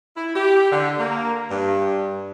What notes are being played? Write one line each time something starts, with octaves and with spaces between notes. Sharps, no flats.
E4
G4
D3
A#3
G2